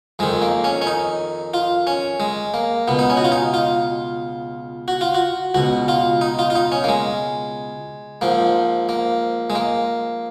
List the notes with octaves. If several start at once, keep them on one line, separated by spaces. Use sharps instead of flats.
F2 D#3 G#3
A#3
C#4
C#4
D#4
F4
C#4
G#3
A#3
C#2 B2 B3
D#4
C#4
F#4
F4
D#4
F4
F#4
F4
F#4
C#2 B2 F#4
F4
D#4
F4
F4
D#4
C#4
A#3
G#3
G#2 F3 A#3
A#3
G#3
A#3